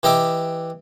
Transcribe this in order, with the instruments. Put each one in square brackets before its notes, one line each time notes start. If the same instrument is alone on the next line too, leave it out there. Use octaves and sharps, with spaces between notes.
[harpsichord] E3 G4 D#5 E5 D6